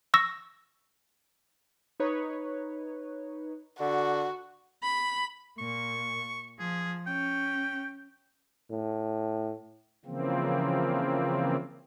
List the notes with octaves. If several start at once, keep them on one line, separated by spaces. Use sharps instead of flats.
C#6 E6 A#6
D#4 B4 C#5
D3 F#4
B5
A#2 C#6
F3 G#4
C#4 G5
A2
C#3 E3 F3 A#3 C4